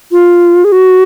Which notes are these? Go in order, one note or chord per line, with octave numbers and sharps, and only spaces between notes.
F4
G#4
F#4